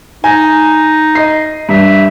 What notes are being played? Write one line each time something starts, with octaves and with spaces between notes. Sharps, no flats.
D#4 G#5
D#5 C7
G2 E5